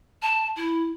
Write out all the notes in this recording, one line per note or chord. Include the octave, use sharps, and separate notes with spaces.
A5
E4